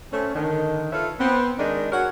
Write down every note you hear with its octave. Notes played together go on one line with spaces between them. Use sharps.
A3 C4 C#4
D3 D#3
F4 A4 B4 C#5 E5
B3 C4
D#3 G#3 D4 D#4
F#4 G#4 A#4 C#5 F#5